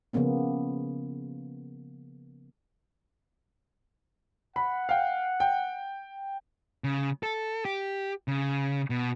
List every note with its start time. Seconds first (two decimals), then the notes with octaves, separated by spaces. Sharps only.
0.13 C#3 F3 A#3 B3 C#4
4.56 F#5 B5
4.89 F5 G5
5.40 G5
6.84 C#3
7.23 A4
7.65 G4
8.28 C#3
8.90 B2